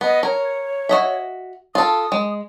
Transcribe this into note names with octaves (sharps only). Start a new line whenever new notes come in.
B3 D#5
A#4 C#5
F#4 D#5 E5
F4 A4 D#6
G#3